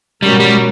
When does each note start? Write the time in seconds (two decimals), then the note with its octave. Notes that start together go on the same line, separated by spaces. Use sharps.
0.22 B2 G3 G#3 C#4 F#4 A#4
0.40 G3